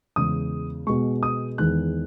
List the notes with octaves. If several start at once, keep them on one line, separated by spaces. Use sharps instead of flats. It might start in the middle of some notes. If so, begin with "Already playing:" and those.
E2 C#3 G#3 D#6
B2 G#3 C#6
D#6
E2 D#3 G#3 F#6